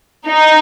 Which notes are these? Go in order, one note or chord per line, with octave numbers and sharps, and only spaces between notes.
D#4